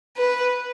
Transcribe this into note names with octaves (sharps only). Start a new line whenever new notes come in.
B4